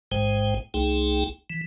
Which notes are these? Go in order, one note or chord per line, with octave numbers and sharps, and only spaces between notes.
A1 G#2 G#3 C5 G5
C2 A3 D#4 G#4 G5
E3